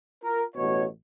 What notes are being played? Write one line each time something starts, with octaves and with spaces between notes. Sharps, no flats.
F4 A#4
A1 B2 C#5